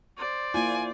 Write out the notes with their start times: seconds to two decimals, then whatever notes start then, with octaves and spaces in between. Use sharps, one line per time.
0.18 C5 D5
0.54 A#3 E4 F4 G#5